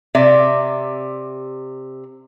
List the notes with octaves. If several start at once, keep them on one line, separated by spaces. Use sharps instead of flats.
C3 D5 E5